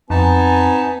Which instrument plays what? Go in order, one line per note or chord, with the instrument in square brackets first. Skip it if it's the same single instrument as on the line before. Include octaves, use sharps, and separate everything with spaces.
[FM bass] F2 [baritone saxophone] B3 [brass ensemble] C4 G#5 [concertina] D#4 A5